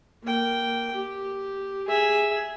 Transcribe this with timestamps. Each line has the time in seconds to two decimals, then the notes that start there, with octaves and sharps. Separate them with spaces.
0.23 A#3 G5
0.95 G4
1.88 G#4 E5